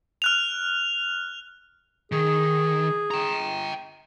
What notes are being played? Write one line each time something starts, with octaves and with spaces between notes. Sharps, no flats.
F6 F#6 F7
D#3 G#4
G5 A#5